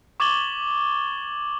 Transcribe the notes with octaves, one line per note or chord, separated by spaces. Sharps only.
C#6 D6 G#6 A6 F#7 G7